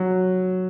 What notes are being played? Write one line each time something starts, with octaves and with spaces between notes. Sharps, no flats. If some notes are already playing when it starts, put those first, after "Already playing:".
Already playing: F#3